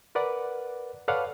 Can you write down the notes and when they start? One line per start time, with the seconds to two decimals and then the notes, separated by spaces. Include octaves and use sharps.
0.15 A#4 B4 D5 F#5
1.08 A4 B4 C#5 D5 F5 F#5